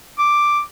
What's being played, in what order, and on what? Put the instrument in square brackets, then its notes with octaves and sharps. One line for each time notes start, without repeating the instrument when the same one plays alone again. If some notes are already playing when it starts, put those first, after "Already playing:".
[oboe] D6